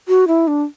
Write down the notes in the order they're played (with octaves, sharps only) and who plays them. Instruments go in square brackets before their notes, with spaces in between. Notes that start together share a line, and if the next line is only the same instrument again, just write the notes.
[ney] F#4
E4
D4